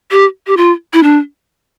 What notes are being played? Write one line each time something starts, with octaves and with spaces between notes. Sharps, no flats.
G4
G4
F4
E4
D4